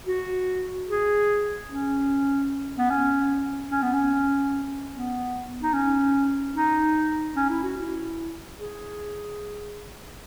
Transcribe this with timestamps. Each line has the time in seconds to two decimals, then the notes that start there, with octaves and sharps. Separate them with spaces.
0.07 F#4
0.87 G#4
1.69 C#4
2.78 B3
2.90 C#4
3.71 C#4
3.83 B3
3.94 C#4
4.93 B3
5.63 D#4
5.74 C#4
6.55 D#4
7.36 C#4
7.50 E4
7.63 F#4
7.77 E4
8.58 G#4